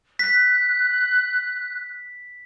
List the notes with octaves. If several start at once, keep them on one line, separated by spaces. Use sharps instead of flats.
F#6 B6